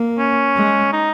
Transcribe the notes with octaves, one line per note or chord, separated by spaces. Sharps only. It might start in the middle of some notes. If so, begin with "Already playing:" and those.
Already playing: A#3
C#4
G#3
D#4